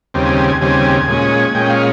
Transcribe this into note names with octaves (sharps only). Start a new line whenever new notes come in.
D#2 C#3 G3 C4
G#5
G#5
G#5
D#2 C#3 G3 C4 G#5
A#2 G#3 C#4
A#2 G#3 C#4 G5
F5